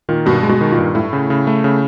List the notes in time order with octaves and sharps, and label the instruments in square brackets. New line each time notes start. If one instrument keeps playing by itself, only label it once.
[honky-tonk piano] A#2 [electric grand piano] D#3
[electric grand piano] G2 [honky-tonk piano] B2
[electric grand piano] G#3
[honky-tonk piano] B2
[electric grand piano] D#3
[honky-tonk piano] A#2
[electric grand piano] G2
[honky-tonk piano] A2 [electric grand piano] A3
[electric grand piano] C#3
C#3
A3
C#3